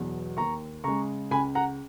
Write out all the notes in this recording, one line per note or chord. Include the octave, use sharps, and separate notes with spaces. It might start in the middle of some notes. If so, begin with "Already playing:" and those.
Already playing: E2 B2 F#3
D#2 A#5 C#6
C#3 G#3 A#5 C#6
C#2 G#5 B5
F#5 A#5